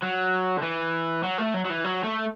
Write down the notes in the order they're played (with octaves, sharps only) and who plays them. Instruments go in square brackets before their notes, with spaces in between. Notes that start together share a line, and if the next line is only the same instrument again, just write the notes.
[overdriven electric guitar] F#3
D3
E3
F#3
A3
F#3
F#3
E3
F#3
A3